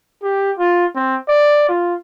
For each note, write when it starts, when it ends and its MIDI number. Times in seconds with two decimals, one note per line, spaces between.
0.23 0.52 67
0.58 0.85 65
0.96 1.16 60
1.28 1.65 74
1.69 1.94 65